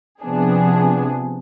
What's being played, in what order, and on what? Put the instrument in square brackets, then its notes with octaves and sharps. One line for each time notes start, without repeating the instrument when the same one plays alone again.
[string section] C3 F3 B3 D4 G#4